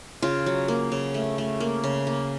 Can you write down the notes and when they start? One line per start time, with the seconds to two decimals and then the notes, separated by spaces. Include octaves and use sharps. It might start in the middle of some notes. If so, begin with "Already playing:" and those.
0.22 C#3 F4
0.46 F#3
0.68 A#3
0.92 C#3
1.14 A3
1.38 A3
1.60 A#3
1.84 C#3
2.07 A#3